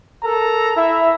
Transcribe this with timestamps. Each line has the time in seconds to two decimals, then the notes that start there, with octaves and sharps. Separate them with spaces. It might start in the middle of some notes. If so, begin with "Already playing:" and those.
0.23 A4 A#4 A#5
0.76 E4 E5